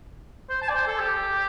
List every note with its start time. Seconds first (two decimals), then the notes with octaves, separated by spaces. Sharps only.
0.49 C5
0.62 A5
0.69 D5
0.74 C5
0.87 A4
0.99 G4